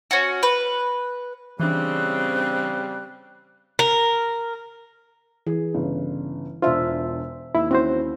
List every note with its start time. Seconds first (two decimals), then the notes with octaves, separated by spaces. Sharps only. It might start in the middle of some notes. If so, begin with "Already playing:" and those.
0.11 C#4 F#4
0.43 B4
1.60 C#3 E3 G3 C4 D4 F#6
3.79 A#4
5.47 E3 G#4
5.74 G1 C#3
6.62 E1 D4 F4 C5 E5
7.55 D#2 E4 E6
7.71 C4 C#4 E4 F#4 C5